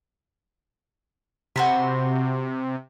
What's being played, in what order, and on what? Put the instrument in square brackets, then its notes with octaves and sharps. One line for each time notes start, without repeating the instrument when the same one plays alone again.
[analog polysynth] C3 [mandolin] F#4 C5 B5